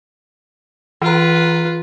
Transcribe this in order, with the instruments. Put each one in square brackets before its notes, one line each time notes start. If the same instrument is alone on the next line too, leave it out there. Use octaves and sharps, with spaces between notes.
[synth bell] E3 A#5 [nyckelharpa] F4 B4